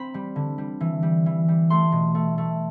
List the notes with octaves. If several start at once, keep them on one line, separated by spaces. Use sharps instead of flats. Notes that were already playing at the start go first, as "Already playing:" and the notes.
Already playing: C4 B5
G3
D3
G3
E3
G3
E3
G3
A3 C6
B2
A3
A3